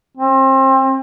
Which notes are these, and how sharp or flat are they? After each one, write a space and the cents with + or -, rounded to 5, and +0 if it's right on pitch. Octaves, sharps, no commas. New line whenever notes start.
C4 +30